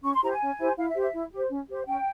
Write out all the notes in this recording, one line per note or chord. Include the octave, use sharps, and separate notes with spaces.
C#4 C#6
C6
E4 G4 C5 A#5
G#5
C#4
E4 G4 C5
E4 F5
E5
G4 C5
E5
E4
G4 C5
C#4
G4 C5
C#4 G5